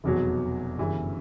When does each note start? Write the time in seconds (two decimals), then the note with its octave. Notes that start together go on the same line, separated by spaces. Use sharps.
0.04 F1 E2 B2 F#3
0.78 G1 F#2 C#3 E3 G3